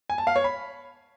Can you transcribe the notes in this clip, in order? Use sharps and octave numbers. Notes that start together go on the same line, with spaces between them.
G#5
A5
F5
C#5
B5